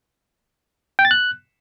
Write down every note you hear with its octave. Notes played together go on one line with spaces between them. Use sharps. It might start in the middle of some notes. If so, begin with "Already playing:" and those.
G5
A6
F#6